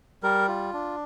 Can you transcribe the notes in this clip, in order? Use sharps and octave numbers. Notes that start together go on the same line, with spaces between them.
G3 A#4
F4
D4